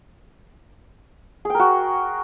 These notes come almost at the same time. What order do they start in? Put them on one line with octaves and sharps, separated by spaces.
G#4 G5 A#4 F#4